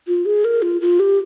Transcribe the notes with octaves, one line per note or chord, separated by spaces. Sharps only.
F4
G#4
A#4
F4
F4
G4